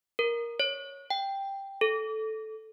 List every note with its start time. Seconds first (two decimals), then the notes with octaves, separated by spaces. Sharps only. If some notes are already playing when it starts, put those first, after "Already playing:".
0.19 A#4
0.60 C#5
1.10 G5
1.81 A4